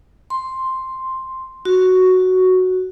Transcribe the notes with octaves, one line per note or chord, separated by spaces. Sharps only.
C6
F#4